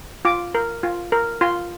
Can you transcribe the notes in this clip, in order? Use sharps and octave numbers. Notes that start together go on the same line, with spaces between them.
F4 D6
A#4
F4
A#4
F4 C6